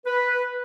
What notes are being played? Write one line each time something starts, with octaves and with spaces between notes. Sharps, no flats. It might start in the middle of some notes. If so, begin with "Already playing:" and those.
B4